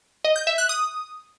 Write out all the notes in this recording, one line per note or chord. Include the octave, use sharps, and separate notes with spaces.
D#5
G6
E5
F#6
D#6